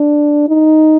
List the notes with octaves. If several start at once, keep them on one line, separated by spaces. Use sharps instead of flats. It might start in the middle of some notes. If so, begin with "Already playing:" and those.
Already playing: D4
D#4